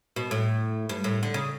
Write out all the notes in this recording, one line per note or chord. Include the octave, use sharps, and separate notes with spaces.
B2
A2
G2
A2
D3
C#3